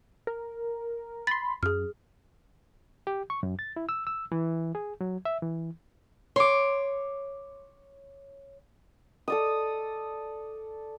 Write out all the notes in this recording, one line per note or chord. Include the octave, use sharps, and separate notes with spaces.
A#4
B5 C6 A6
F#2 G#4 F6
G4
C#6
F#2
A6
E4
E6
E6
E3
G#4
F#3
E5
E3
C#5 C6 D6
A4 D5 D#6